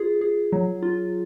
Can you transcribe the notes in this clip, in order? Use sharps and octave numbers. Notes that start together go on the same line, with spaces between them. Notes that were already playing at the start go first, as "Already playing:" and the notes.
Already playing: F4 G#4
G#4
F#3
F4